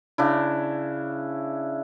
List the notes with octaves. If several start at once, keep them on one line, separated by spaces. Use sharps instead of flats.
C#3 D4 E4